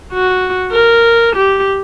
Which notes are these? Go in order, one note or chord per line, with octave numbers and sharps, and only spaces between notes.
F#4
A#4
G4